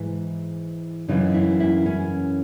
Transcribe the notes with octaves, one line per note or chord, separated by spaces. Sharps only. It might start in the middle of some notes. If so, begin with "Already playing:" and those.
Already playing: G#2 E3 E4
F#2 C#3 E3 D#4
E4
E4
C#4